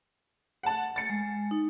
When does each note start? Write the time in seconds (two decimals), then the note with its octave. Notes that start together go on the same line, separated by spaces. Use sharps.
0.63 F#5 A5
0.96 A6 C#7
1.10 G#3
1.51 D#4